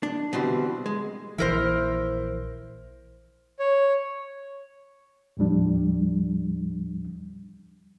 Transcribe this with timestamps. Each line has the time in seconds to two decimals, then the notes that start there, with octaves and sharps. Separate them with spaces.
0.03 D4
0.33 B2 D3 E3 G3 C4
0.86 G#3
1.38 A#1 E3 E4 A#4 C5
3.59 C#5
5.37 D#2 A2 F3 G3 D4